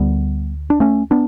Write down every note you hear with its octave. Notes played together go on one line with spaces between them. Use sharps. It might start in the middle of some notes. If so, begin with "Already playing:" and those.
Already playing: D2 D3 G3 B3
D4
A3 C#4
B3 D4